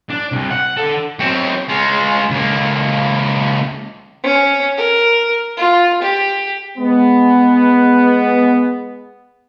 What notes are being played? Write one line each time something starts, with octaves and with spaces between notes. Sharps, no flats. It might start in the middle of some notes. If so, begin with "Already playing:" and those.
D4
C2
F#5
D3 A4
F#3 C4
G#3 F4
C#2 A#3
C#4
A#4
F4
G4
G#3 B3